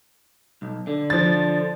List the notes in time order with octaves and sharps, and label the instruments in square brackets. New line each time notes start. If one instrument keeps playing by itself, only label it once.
[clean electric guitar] B1
D3
[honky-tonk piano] F3 A6